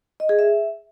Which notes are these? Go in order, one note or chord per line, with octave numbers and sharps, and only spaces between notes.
D#5
G#4
E5